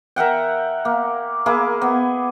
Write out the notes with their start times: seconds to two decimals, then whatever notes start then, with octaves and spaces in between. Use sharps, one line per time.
0.16 A#4 E5 F#5 G5
0.85 A#3
1.46 A#3 E4 G#4 D6
1.82 B3